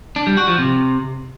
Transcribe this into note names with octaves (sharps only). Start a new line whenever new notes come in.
D4
G3
F#4
F3
C3